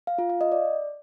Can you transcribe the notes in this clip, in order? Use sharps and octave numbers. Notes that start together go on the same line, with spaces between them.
F5
F4
F5
D#5
D5